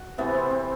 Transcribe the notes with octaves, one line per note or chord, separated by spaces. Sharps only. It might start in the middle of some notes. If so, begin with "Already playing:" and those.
Already playing: F#4
C3 E3 A3 B3
C4
C4